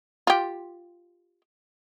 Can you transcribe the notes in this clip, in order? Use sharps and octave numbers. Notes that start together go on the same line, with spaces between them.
F4 G4